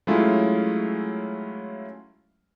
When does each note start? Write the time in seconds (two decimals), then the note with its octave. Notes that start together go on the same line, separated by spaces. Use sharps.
0.07 F#3 G#3 A3 C#4 E4 F4